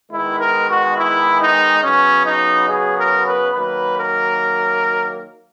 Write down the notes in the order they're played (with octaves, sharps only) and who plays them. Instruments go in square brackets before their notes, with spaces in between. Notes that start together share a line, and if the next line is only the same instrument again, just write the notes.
[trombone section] D#3 G#3 B3 E4
A#4
F#4
E4
D#4
C#3 F#3 B3 C#4
D#4
G#4
A#4
B4
D#3 F#3 A#3 B4
A#4